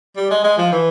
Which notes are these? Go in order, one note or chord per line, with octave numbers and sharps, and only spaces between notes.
G3
G#3
G#3
F3
E3